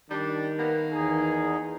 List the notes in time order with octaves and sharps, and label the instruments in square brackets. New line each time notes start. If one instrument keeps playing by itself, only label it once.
[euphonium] D#3 [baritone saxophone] G3 [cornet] D4
[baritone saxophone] A#3 [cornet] B3
[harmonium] E2 D#4 [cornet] G#4